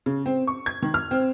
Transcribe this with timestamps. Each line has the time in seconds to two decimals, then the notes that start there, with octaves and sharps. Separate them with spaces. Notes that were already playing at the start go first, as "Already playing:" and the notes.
0.06 C#3
0.26 C4
0.47 C#6
0.66 G#6
0.82 D#3
0.94 F6
1.11 C4